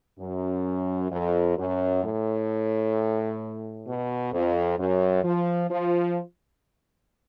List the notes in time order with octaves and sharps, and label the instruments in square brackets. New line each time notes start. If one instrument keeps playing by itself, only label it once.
[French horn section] F#2
F2
F#2
A2
B2
F2
F#2
F3
F3